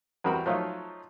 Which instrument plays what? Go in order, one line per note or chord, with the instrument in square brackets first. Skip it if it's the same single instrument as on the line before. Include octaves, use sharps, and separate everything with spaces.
[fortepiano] E2 G3 C4 F#4 A#4 B5
F3 F#3 A3 D#4 F4